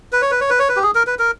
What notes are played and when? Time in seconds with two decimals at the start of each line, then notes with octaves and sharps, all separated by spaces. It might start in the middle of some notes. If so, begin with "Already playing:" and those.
0.12 B4
0.22 C#5
0.31 B4
0.41 C#5
0.50 B4
0.59 C#5
0.69 B4
0.76 G4
0.83 G#4
0.95 A#4
1.07 B4
1.19 A#4